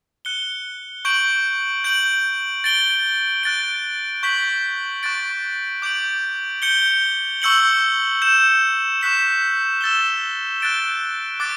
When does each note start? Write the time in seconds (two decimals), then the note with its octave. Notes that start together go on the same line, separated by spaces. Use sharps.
0.25 F#6 C#7 G7
1.05 C#6 G6 D7 F#7
1.84 G6 D7 F#7
2.64 A6 D7 G7
3.43 F#6 A6 D7
4.23 C#6 G6 B6 F#7
5.03 C#6 F#6 A6 D7
5.82 D6 G6 D7 F#7
6.62 G6 C#7 G7
7.42 C#6 E6 G6 C#7 F#7
8.22 G6 C#7 E7
9.01 C#6 F#6 B6 E7
9.81 E6 A6 E7 G7
10.60 F#6 A6 D7 G7
11.40 D6 F#6 A6 D7